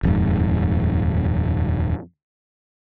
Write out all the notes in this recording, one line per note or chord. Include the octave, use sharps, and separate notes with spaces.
D#1 F2 G#2